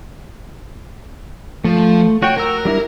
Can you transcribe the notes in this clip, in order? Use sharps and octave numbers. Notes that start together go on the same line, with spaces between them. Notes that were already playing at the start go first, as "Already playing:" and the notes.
F3 A3
F#4 C#5 G5
F#4 A#4 A#5 E6
G3 D4 E4